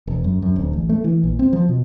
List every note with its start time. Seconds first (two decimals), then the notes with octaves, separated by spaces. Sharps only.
0.07 E1
0.24 F#2
0.42 F#2
0.56 D1
0.73 A1
0.89 A3
1.04 E3
1.24 A#1
1.39 C4
1.53 F3
1.69 B2